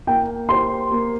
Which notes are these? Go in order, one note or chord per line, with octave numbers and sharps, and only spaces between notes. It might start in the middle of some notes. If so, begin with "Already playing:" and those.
A#3 G5
G4 C5 C6
A#3